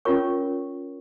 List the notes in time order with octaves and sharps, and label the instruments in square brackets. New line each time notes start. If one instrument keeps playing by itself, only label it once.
[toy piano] C#4 F4 A#4 C#5 C#6